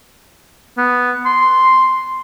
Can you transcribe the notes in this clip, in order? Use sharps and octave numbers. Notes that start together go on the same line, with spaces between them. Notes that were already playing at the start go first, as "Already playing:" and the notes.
B3
C6